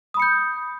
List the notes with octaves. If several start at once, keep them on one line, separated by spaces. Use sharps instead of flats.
B5 D#6 G6 C#7